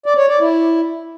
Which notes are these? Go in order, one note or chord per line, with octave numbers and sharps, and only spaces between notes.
D5
C#5
D5
E4